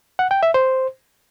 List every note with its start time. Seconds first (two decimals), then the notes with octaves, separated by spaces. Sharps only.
0.19 F#5
0.31 G5
0.43 E5
0.54 C5